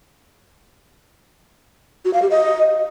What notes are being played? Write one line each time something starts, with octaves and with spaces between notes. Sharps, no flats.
F#4
F5
G4
D#5